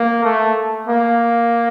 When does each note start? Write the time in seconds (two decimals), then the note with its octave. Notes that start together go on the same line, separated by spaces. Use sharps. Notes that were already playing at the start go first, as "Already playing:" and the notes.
Already playing: A#3
0.24 A3
0.88 A#3